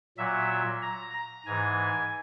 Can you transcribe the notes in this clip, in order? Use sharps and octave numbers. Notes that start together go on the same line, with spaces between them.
A#2 F#3 E5
A#5
A#5
G#2 E3 G#5